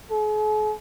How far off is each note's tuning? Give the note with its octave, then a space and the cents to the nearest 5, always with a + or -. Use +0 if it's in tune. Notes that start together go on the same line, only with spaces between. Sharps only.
G#4 +45